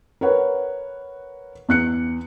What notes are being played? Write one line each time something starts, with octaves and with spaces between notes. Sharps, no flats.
A#4 B4 C#5 F#5
E2 F#6 C#7